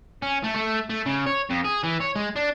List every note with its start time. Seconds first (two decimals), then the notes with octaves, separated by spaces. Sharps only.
0.22 C#4
0.44 A3
0.56 A3
0.90 A3
1.06 C#3
1.26 C#5
1.50 F2
1.65 G#4
1.83 E3
2.00 C#5
2.16 G#3
2.36 D4